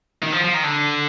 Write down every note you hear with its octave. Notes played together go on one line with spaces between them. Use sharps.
D#3
F3
F3
D#3
D3